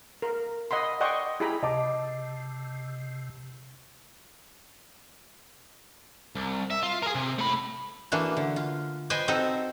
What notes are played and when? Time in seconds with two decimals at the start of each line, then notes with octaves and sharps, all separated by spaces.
0.22 A#4
0.71 D#5 F#5 B5 C6
1.00 D5 D#5 F#5 G5 C6 C#6
1.40 E4 G4 G#4 A#5 B5
1.63 C3 D#5 A5 D6
6.35 C2
6.70 E5
6.83 F4
7.02 G#4 A#4
7.15 C3
7.38 A3 B5
8.12 E3 A3 A#3 D4 F#4
8.37 D3
8.56 F4
9.10 B4 C5 D#5 G5 G#5
9.28 C4 D#4 F#4 A4